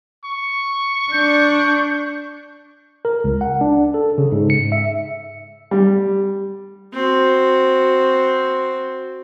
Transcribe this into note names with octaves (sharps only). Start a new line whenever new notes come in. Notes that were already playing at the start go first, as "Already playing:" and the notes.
C#6
D4 G6
A#4
C#2
F#5
D4
A4
C#3
G#2
C#7
E5
G3
C4 F#4